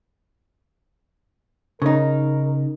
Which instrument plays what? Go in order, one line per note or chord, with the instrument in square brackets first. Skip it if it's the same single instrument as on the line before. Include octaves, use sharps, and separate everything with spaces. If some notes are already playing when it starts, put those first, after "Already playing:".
[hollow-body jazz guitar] C#3 D#4 [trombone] A#4